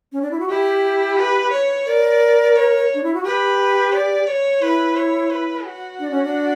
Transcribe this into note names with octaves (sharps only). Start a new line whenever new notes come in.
C#4
D4
E4
F#4
E4 G4
B4
C#5
A#4 D5
C#5
D4
E4
F#4
G4 B4
D5
C#5
E4 B4
C#5
B4
F#4
D4
C#4
D4